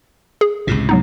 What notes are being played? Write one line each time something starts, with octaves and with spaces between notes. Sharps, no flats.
G#4
G#1 C#2 A2 C3
F#3 B3 D#4